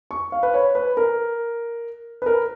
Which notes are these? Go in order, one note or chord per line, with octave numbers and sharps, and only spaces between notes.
C#6
F5
B4
C#5
B4
A#4
B4
A#4